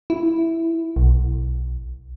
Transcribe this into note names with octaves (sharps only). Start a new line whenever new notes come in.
E4
B1